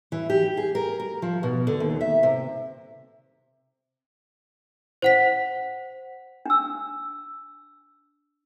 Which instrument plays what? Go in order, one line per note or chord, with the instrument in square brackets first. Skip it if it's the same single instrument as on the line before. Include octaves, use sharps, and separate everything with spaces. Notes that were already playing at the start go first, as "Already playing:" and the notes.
[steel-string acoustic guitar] E3
G4
G#4
A#4
A#4
F3
B2
D3
D#2
E5
C3
[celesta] C5 F#5 B6
[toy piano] D4 E6